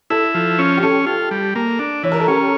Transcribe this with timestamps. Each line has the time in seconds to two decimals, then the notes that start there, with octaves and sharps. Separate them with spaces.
0.10 E4 A4
0.35 F3
0.59 C#4
0.77 G4
0.83 C#4 A4
1.07 F4
1.31 G3
1.55 A#3
1.79 D4
2.03 E3 C#5
2.12 A#4
2.20 A4
2.28 C#4 G4